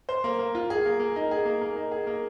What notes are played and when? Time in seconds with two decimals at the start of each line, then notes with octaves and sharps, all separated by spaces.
0.09 C5
0.24 A#3
0.39 A#3
0.55 F4
0.70 G#4
0.86 A#3
1.00 A#3
1.16 D#4
1.31 G#4
1.45 A#3
1.61 A#3
1.76 D#4
1.92 G#4
2.07 A#3